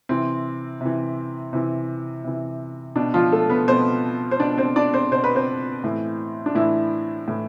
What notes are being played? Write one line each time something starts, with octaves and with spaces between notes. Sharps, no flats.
C3 E3 C4
C3 E3
C3 E3
C3 E3
B2 D4
F3 F4
A3 A4
B3 B4
B2 C4 C5
C5
B2 D4 D5
C4 C5
D4 D5
C4 C5
B2 C5
B4
C4 C5
A2 E3
D4
A2 E3 E4
A2 E3